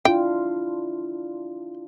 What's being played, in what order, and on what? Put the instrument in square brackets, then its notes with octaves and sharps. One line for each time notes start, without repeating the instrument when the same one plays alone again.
[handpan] D4 E4 F4 [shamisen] G5